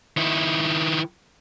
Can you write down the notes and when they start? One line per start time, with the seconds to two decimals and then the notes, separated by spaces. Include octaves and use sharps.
0.17 D#3 E4